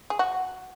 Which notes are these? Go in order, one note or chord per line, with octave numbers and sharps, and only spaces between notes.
G#4
F#4